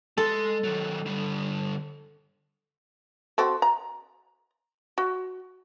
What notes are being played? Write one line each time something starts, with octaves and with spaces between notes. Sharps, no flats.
G#3 A4 C6
D#3 F#3
D3 G3
C4 F#4 A4
A#5
F#4